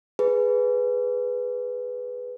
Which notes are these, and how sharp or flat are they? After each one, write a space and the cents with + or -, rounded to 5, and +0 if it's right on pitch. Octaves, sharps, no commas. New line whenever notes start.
G#4 +0 B4 +0